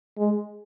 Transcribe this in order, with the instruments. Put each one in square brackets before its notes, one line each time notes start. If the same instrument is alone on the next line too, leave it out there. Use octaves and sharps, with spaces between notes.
[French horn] G#3